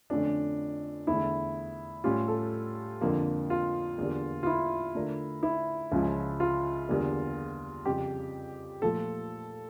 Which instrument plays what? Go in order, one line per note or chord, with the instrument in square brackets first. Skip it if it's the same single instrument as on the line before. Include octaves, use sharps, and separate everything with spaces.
[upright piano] F2 D3 A3 C#4 F4 [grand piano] D4
[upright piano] E2 D3 A3 [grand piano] E4
[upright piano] A2 G3 C#4 G4 [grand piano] F4
[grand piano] A4
[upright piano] F2 D3 F3 A#3
[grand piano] F4
[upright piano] E2 D3 G3 A#3 D4
[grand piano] F4
E4
[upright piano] D3 A3 D4 F4 A#4
[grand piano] E4
[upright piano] C#2 C#3 F3 C#4
[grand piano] F4
[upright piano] E2 D3 G3 A#3
[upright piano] F2 C#3 G3 [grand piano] G4
[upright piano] A#2 F3 A3 [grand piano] A4